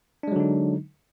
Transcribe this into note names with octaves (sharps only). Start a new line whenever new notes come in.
D3 F#3 G#3 D4 D#4